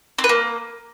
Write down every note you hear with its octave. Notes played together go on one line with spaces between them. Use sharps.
C4
B4
A#3